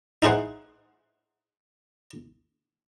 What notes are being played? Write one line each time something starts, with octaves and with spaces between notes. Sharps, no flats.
D#4 E4 G#4 C5 F#5